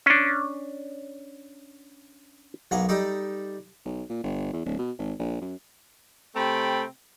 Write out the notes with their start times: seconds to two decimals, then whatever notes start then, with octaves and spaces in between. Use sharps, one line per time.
0.06 C#4 D4
2.71 B1 A#3 F#5 G#5
2.89 G3 D#4 A4 D5
3.85 B1
4.10 A#2
4.23 G1
4.53 E2
4.65 D1
4.79 B2
4.99 G#1
5.19 A#1
5.41 F#2
6.35 C3 A3 C4 G5 A5 B5